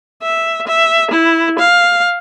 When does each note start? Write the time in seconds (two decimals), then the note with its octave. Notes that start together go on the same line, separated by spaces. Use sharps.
0.22 E5
0.67 E5
1.11 E4
1.59 F5